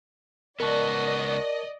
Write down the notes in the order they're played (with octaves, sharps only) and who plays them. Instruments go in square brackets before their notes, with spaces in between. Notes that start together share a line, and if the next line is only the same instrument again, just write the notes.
[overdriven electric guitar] C#2 B3 [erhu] F#4 [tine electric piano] A#4 A5 [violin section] D5 D#5